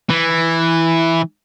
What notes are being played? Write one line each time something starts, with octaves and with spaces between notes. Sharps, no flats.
E3